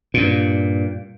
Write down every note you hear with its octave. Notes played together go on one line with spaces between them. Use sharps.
G2 A#2